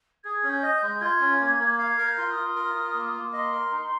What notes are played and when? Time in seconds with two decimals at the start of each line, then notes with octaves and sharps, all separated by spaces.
0.24 G#4 G#6
0.43 C#4
0.50 G6
0.63 D#5
0.76 G6
0.83 G#3
1.01 F4 G#6
1.20 C#4
1.40 A#3
1.59 A#3
1.79 F5 G#6
1.98 A#4
2.04 G6
2.18 F4
2.30 D#6
2.36 F4
2.56 A#4
2.74 F4
2.94 A#3
3.13 A#3
3.33 D#5 C6
3.52 A#4
3.72 D#4